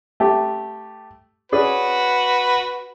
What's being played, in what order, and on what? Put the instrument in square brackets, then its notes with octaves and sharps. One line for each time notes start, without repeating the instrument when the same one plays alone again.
[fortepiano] A3 G4
[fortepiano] C#4 G#4 D5 [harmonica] F#4 B4